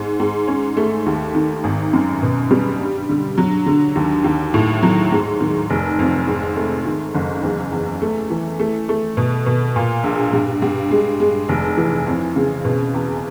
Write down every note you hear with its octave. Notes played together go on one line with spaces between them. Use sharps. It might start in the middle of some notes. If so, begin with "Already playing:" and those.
Already playing: G#2
G#2
C#4
A3
D#2
D#3
G#1
F#2
B2
G3
G2
D3
F#3
D3
D#2
D#2
A2
F#3
G#2
D#3
F1
F2
G#2
A3
D#3
F#1
E2
E2
A3
E3
A3
A3
B2
B2
A#2
A#1
G2
G2
G#3
G#3
F1
E3
F2
C#3
B2
E2